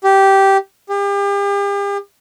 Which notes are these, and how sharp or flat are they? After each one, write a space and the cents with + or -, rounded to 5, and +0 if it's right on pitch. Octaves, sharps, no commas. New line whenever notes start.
G4 -10
G4 +40